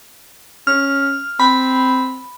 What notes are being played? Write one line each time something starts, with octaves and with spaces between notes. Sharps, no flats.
C#4 F6
C4 B5